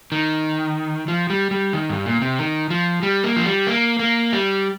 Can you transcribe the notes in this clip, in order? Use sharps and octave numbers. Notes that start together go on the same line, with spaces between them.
D#3
F3
G3
G3
D#3
G2
A#2
C3
D#3
F3
G3
A#3
F3
G3
A#3
A#3
G3